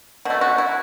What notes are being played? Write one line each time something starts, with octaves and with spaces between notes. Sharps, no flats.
B2 A3 F#4
F#4
E4